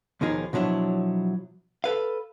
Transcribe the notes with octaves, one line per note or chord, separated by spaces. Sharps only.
D#2 B2 D#3 F3 D#4 G#4
B2 F3 F#3 D4 E4
A4 B4 F5